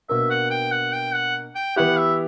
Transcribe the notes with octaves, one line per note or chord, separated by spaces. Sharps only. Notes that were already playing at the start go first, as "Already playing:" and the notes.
B2 A#3 D4 A#4 E5
F#5
G5
F#5
G5
F#5
G5
E3 B3 E4 G4 F#5
E5